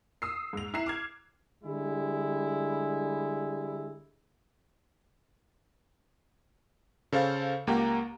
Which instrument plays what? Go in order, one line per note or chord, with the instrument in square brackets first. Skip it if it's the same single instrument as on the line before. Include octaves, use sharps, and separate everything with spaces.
[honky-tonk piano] D#6 E6 C7
G#2 F7
E4 A#5 F#6 C7 E7
D6 F6 G#6
[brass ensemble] D3 G3 G#3 E4
[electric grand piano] C#3 A4 C5 F5 A6
C#2 A#3 G4 F#5 A#5